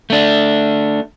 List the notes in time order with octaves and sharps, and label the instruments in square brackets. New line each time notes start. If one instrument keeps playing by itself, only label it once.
[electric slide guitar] A3 D4